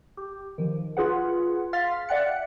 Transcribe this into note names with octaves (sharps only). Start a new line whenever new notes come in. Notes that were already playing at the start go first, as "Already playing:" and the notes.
G4
D#3 F3
F4 G#4 B4 F#5
F5 C6 F6 A6 B6
D5 E5 F#5 G5 F#6 C#7